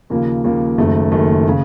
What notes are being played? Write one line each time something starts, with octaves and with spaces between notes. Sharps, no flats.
D#2 C#3 F3 A#3
D#2 C#3 F3 A#3
F#1 F#2 D#3 A3
F#1 F#2 D#3 A3
C#3